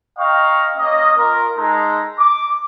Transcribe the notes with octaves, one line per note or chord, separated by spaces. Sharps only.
D#5 F5 G5 A#5 C#6
A#3 C#4 D#5
F4 A#4
G#3 D#4 A4 A#5
D6